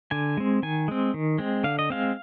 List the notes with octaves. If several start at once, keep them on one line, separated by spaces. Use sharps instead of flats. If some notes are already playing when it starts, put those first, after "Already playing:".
D3 G#5
G#3 C4
D#3 G#5
G#3 C4
D#3
G#3 C4
D3 F5
D#5
G#3 C4 F5